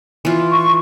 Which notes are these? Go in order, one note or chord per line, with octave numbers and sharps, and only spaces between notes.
E3 F4
C#6